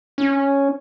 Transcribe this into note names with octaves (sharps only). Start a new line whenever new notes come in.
C#4